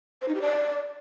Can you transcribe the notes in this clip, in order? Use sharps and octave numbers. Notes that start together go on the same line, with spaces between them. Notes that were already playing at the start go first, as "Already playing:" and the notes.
C5
D#4
G4
D5